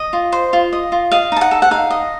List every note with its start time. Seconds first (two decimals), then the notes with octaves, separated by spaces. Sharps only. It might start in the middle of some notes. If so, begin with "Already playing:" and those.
Already playing: D#5
0.13 F4
0.32 C5
0.53 F4
0.73 D#5
0.92 F4
1.11 D#5 F5
1.32 D#4 A5
1.41 F#5
1.51 A4
1.62 F#5
1.71 D#4 F5
1.90 D#5